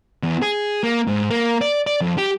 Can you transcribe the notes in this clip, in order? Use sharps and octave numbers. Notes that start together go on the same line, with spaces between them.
E2
G#4
A#3
G#2
A#3
D5
D5
F2
G4